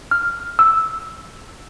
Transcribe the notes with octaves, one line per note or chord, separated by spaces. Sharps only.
F6
E6